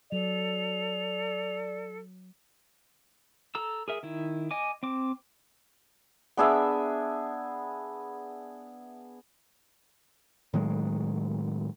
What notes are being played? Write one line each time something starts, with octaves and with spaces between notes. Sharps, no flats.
F#3 A4 D5 F7
A4 A#5 E6
G#4 A#4 E5
D#3 E4
D#5 G#5 D6
C4 D6
B3 D4 G#4 E5
A2 D#3 F#3 G#3